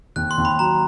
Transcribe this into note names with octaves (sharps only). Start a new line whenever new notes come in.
D#2 F#6
C6
D#2
B5
F#3 A#5